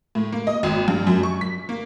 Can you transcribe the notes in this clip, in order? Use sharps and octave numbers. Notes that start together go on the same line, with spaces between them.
A2
A#3
D#5
G#1
G2
F#2
C#6
B6
A#3